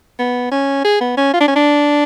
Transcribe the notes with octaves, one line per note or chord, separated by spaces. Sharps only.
B3
C#4
G#4
B3
C#4
F4
D4
C#4
D4